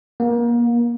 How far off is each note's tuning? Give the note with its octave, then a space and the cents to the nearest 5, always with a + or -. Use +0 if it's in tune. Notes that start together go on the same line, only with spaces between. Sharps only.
A#3 +30